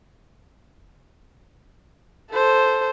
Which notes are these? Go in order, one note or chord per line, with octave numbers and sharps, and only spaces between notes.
A4 C5